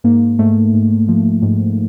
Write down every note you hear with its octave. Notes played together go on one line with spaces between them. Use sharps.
G#2 A#3
G#2 A3
G#2
F3
G#2